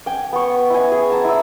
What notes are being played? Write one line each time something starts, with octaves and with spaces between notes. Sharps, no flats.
G5 G#5
B3 C#6
E4 G#5
G#4
A5 A#5
E4 A#5 E6